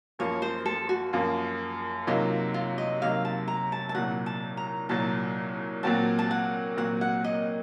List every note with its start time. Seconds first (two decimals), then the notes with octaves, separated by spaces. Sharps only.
0.19 F#2 F3 A#3 F4 C#5
0.42 C5
0.66 A4
0.89 F#4
1.13 F#2 F3 A#3 F4
2.07 C3 F#3 A#3 D#4 F4
2.54 F4
2.78 D#5
3.01 C3 F#3 A#3 D#4 F5
3.25 A5
3.48 A#5
3.72 A5
3.89 A5
3.95 C2 A#2 F#3 F#5
4.26 A5
4.57 A#5
4.89 C2 A#2 F#3 A5
5.83 A#2 F#3 C4 F#4 A5
6.19 A5
6.31 F#5
6.77 A#2 F#3 C4 F#4 F#5
7.01 F#5
7.24 D#5